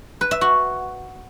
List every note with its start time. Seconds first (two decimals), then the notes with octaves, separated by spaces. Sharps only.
0.21 B4
0.31 E5
0.41 F#4